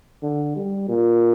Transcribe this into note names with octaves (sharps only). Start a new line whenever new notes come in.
D3
G3
A#2